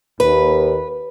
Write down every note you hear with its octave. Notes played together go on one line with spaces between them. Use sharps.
D#2 B4